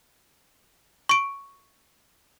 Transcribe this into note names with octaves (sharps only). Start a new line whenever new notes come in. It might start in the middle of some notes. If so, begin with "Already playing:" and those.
C#6 D7